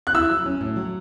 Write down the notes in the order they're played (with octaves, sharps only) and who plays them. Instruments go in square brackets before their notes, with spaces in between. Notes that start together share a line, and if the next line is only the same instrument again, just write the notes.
[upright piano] F#6
[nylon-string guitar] E4 [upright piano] E6
[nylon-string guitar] F#3
C#4
A2
F#3